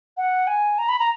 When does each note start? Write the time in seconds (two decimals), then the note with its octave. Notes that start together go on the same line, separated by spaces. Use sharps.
0.17 F#5
0.47 G#5
0.78 A#5
0.89 B5
0.99 A#5